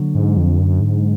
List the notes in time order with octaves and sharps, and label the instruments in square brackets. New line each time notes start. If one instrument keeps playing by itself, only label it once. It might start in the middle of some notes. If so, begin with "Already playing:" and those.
Already playing: [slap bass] D3 F#3 A#3
[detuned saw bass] G#2
F2
F#2
G#2